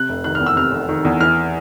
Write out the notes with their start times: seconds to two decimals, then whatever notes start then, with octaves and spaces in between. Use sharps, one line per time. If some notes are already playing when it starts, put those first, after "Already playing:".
Already playing: C3 F#6
0.09 F1
0.24 D#3 F#6
0.35 E2 F6
0.46 E6
0.56 C3 F6
0.72 F1
0.89 D#3
1.05 E2
1.20 E3 F6